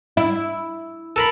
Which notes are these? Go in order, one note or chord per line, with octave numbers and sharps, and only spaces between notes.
E4
A4 A#4 B5